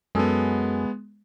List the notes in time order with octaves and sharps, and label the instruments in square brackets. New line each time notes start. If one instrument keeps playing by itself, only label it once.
[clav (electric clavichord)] F#2 G#4 A4 [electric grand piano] G#3 B3